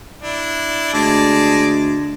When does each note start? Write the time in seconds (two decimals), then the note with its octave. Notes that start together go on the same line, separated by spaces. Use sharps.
0.22 D4 E4
0.94 D2 G#3 D5 A5